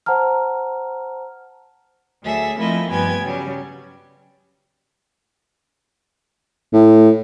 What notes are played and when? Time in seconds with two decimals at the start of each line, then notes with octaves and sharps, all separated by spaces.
0.06 C5 F#5 A5 A#5 F6
2.22 D2 F#3 G#4 A4 E5
2.56 F3 A3 A#3 C4 E4 D#5
2.90 G2 F3 B3 G5 G#5 G#6
3.22 C#3 F#3 G3
6.73 A2